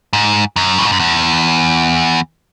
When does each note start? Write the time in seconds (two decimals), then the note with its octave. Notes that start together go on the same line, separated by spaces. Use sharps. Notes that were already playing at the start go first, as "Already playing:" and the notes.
0.13 G#2
0.56 F#2
0.78 A2
0.85 G#2
0.92 F#2
0.99 E2